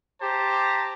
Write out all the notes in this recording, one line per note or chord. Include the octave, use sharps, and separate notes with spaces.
G4 C5 A5 A#5